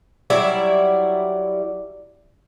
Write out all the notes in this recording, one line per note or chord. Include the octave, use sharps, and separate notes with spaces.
F#3 G3 E4 D5